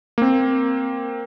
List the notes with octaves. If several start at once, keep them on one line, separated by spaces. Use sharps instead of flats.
A#3 C4